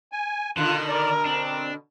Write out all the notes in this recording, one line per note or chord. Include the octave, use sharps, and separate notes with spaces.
G#5
B2 D3 D#3 F4 F#6
A#4 D5
C4 D4